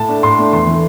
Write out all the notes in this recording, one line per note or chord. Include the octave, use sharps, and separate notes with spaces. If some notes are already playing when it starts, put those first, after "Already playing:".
Already playing: A2 A5
A3 D4
A2 C6
A3 D4
E2 C6
E3 A3